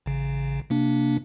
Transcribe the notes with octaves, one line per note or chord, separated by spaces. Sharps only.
A1 C#3
C3 A#3 D4